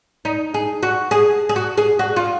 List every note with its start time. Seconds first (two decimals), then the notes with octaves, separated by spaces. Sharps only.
0.25 D#4
0.54 G#4
0.83 F#4
1.11 G#4
1.49 G#4
1.56 F#4
1.78 G#4
1.99 F#4
2.16 F4